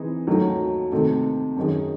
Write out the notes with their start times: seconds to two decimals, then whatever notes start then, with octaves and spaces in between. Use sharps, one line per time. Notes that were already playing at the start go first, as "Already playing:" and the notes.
Already playing: E3 C4 D#4 G#4
0.27 D#2 D#3 F#3 A3
0.92 C3 D#3 A3
1.57 F#2 D#3 G#3